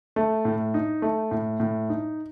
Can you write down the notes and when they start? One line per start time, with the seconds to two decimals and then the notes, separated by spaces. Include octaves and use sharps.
0.16 A3
0.45 A2
0.74 D#4
1.02 A3
1.31 A2
1.60 A2
1.89 D#4